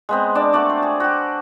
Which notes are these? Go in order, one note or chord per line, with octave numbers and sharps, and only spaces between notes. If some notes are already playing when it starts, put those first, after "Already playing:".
G#3 B3 C4
D4 D5 A5
A3 F#4 D5 D6
C5
G#4
F#4 G4